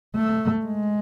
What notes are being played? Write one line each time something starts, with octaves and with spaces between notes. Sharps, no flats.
A3
G#3